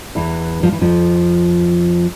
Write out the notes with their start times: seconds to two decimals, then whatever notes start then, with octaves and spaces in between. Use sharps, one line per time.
0.15 E2 E3
0.63 F3
0.72 E3
0.81 F2 F3